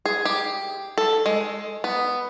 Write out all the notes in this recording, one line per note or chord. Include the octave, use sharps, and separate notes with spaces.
G#4
G4
A4
G#3
B3